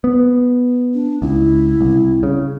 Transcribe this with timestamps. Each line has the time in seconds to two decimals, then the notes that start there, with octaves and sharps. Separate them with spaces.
0.04 B3
0.94 D4
1.22 C#2 E4
1.81 C2
2.23 C#3